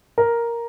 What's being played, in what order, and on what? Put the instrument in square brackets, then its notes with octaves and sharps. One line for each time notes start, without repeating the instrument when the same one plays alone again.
[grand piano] A#4